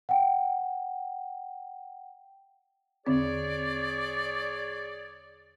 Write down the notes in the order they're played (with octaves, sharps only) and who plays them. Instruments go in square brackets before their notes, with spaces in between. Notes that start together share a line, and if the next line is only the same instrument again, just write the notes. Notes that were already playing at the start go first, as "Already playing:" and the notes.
[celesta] F#5 G5
[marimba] E2 D3 C4 [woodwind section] G#4 C#5 D5